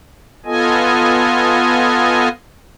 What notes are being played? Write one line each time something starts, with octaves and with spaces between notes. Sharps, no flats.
B3 F4 A4 D#5 G#5